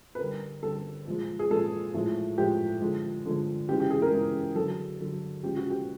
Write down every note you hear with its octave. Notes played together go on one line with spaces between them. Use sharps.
B4
D3 G3 A#4
D3 G3 A4
A#2 F3 G#3
G#4
A#2 F3 G#3 A4
A2 F3 G#3
A2 F3 G#3 G4
D3 F3 G#3
D3 F3 G#3
C#3 E3 G#3 G4
G4
G#4
A#4
C#3 E3 G#3
D3 F#3 A4
D3 F#3
C#3 F3 G#3 G4
F#4
G4